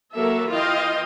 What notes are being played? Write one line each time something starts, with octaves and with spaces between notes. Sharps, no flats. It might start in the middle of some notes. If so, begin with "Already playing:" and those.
F#3 A#3 A4 A#4 E5
E3 F4 D#5 F5 G5